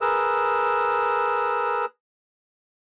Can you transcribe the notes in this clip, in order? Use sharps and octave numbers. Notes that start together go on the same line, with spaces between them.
G#4 A#4 B4 E6